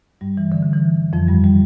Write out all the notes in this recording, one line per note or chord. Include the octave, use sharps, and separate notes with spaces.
G2 G3
E3
D3
D3
E3
F2 F3
G2 G3
G3